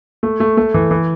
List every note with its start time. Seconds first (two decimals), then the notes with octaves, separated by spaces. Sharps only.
0.23 A3
0.40 A3
0.57 A3
0.74 E3
0.91 E3